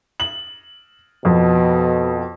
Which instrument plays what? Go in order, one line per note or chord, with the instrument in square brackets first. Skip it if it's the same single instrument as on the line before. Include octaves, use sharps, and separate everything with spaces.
[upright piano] F#7
[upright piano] F2 [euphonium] B2